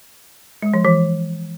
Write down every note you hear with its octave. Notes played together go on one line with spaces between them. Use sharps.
G#3
F3
E3